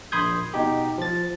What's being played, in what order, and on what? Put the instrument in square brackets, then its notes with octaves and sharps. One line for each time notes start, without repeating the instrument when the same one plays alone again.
[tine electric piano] A#1 B5 C6 D#6 G6 G#6
B2 D#4 G4
F3 A6